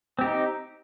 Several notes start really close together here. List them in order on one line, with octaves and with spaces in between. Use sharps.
C4 G4 D#4